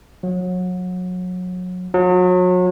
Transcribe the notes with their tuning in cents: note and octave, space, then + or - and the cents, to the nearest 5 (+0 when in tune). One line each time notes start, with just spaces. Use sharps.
F#3 -30
F#3 -35